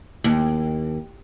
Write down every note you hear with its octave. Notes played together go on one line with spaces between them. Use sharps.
D#2